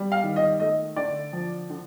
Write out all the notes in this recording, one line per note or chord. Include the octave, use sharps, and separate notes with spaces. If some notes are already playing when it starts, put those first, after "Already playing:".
Already playing: G3
F5
D#3
D#5
A3 D#5
D3 D5
F3
D3